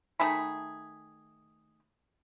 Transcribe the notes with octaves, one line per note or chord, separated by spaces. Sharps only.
D#3 A3 G#4 B5